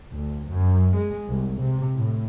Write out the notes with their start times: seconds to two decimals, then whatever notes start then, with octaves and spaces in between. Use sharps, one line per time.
0.13 D2
0.49 F#2
0.96 G#3
1.29 C2
1.61 C3
1.94 A2